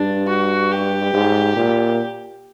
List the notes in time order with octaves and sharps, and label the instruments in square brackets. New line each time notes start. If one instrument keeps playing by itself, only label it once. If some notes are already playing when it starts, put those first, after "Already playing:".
Already playing: [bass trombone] G2 [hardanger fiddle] D4
[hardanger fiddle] F#4
G4
[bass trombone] G#2
A#2